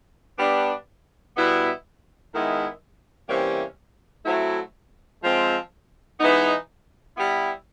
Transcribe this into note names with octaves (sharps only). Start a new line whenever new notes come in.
G3 B3 D4
B2 G3 B3 E4
D#3 G#3 B3 E4
C3 E3 G3 A#3 C#4
F#3 A3 C4 E4
F3 G#3 C4
E3 G#3 B3 D#4
G3 B3 E4